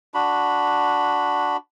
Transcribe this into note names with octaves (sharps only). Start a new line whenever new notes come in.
D4 F#4 B5